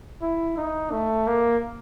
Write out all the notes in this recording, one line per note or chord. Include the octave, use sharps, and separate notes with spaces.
E4
D#4
A3
A#3